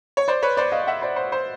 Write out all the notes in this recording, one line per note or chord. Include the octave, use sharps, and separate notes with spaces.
C#5
C5 D5
B4 C#5
C5 D5
D#5 F5
F5
E5 F#5
C5 D5
C5
C5